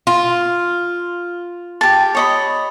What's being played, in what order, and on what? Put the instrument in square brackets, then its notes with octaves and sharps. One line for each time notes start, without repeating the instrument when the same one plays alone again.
[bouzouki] F4
[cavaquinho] G4 A5
C#5 D#5 B5